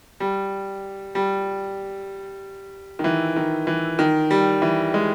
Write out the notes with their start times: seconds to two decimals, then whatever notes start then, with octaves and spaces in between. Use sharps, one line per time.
0.20 G3
1.15 G3
2.99 D#3
3.04 E3
3.36 D#3
3.67 E3
3.99 D#3
4.31 G3
4.62 E3
4.94 G#3